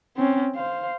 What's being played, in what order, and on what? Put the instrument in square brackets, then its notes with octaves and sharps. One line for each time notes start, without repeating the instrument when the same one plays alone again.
[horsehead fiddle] C4 C#4
C5 F5